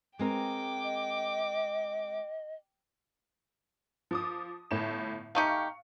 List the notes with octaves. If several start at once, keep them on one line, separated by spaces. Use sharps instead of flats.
G#3 C4 A#4 G5 D6
D#5
F3 D6 D#6
G1 A2 E7
A3 D#4 G4 F5 C#6 C#7